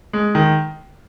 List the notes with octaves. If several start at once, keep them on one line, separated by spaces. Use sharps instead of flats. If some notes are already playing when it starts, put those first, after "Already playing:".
G#3
D#3